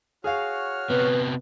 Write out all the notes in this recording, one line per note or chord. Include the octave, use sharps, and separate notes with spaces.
F#4 G#4 C#5 F5 F6
C3 B3 B4